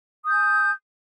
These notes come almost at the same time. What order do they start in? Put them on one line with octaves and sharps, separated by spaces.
D#6 G6 G#5